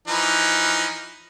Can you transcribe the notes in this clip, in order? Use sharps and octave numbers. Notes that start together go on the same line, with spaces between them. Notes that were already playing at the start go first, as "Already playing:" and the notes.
E3 F3 D#4